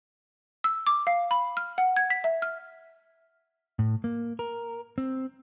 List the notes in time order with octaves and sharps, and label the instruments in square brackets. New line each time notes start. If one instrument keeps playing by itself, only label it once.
[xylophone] E6
D6
F5
B5
F6
F#5
G#6
B6
E5
F6
[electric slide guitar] A2
A#3
A#4
C4